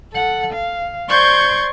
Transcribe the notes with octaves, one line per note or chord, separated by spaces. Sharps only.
A4 F#5
F5
C5 D5 C6 C#6 G6 G#6